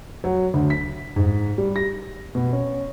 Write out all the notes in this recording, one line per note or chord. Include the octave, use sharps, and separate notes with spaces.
F#3
D2
B6
G#2
G3
A#6
B2
C#4